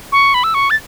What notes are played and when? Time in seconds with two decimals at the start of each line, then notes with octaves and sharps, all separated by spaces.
0.12 C#6
0.34 B5
0.44 E6
0.54 C#6
0.70 A6